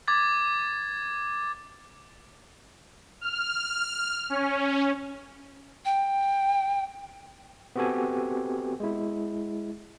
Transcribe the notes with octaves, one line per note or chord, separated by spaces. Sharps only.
D6 G#6 A6
F6
C#4
G5
B3 C4 F#4 G4 A4 G#5
G#3 E4